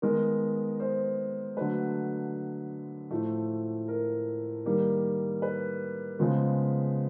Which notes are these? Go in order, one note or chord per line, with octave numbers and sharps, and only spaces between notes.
D#3 G#3 B3 A#4
C5
D3 F#3 A3 B4
A2 F3 A3
A#4
D#3 G3 A#3
B4
C#3 F3 G#3 B3